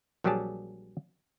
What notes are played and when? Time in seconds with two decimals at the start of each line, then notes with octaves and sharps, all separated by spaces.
0.24 A#1 F#3 G3 G4 G#4 A5